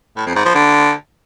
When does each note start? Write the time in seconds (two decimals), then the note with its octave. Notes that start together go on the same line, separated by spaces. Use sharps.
0.17 A2
0.26 F2
0.36 G#2
0.45 F3
0.55 D3